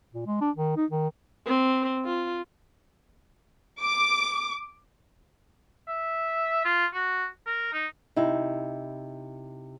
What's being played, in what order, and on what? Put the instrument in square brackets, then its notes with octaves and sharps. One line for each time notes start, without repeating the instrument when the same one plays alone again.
[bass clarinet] A#2
G#3
D4
D#3
D#4
D#3
[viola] C4
F4
[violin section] D6
[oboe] E5
F4
F#4
A#4
D#4
[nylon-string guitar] C3 D#4 E4